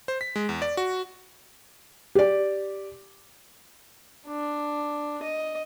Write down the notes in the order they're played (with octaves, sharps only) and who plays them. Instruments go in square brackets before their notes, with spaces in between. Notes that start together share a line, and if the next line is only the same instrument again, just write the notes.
[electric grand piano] C5
B6
G#3
E2
D5
F#4
[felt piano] G4 D5
[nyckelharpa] D4
D#5